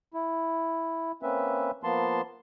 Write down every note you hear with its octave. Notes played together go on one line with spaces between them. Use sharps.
E4
A#3 C4 C#4 B4 E5
F3 A#3 B3 A5 C6